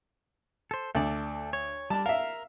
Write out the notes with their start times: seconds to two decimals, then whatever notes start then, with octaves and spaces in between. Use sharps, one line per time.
0.71 A4 C5
0.95 D2 A4 D5
1.53 C#5
1.90 G3 D4 A5
2.06 A#4 E5 F5